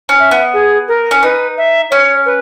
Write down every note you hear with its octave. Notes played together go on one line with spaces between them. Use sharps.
C#4
E5
B3
G#4
A#4
C#4
D#4 B4
E5
C#4 C#5
B4